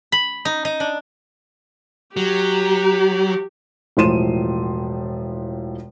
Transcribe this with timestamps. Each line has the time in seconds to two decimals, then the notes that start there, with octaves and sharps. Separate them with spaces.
0.12 B5
0.45 D#4
0.65 D#4
0.80 D4
2.17 F#3 G4
3.97 E1 A2 F3 C6 D#7 E7